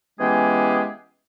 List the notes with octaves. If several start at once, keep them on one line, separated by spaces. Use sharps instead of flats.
E3 G#3 B3 C#4 G4 G#4